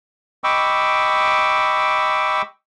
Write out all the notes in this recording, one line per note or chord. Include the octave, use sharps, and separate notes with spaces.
D#5 G5 B5 C#6 D6 E6